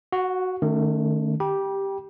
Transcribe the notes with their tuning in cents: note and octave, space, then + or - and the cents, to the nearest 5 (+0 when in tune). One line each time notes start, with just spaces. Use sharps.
F#4 +0 F#5 -40
D#3 -35 A3 +0 C#4 +0
G4 +0 G5 +0 B5 -40